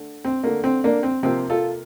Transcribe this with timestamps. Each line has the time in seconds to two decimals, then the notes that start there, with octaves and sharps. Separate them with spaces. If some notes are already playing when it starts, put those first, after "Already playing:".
Already playing: D3 A3
0.25 C4
0.44 D3 A3 A#3
0.64 C4
0.84 A#3 D4
1.03 C4
1.23 C3 F3 A#3 C4
1.50 F4 A4